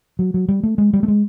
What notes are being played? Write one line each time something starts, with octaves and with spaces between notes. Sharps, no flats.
F#3
F#3
G3
A3
G#3
G3
A3
G#3